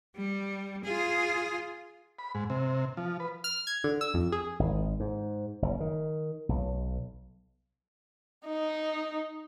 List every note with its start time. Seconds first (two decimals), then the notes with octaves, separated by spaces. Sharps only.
0.16 G3
0.84 F4 G#4
2.19 B5
2.35 G#2
2.50 C3
2.97 F3
3.20 B4
3.44 F6
3.67 G#6
3.84 D3
4.01 E6
4.14 F2
4.32 G#4
4.59 G#1
5.00 G#2
5.62 F#1
5.80 D#3
6.49 B1
8.47 D#4